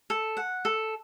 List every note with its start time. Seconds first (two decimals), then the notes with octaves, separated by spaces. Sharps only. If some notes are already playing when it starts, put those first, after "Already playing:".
0.10 A4
0.37 F#5
0.65 A4